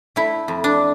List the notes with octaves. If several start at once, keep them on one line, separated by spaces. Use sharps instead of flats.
A3 E4
F2
D4